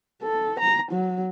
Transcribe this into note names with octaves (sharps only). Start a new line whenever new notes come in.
A4
A#5
F#3